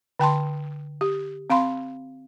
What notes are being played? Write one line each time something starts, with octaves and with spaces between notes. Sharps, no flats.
D3 G5 A5 C6
G4
C4 F5 B5 C6